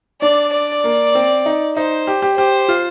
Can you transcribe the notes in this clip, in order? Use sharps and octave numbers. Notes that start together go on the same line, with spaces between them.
D4 D5
D5
A#3
C4
D#4
D#4 C5
G4
G4
G4 C5
F4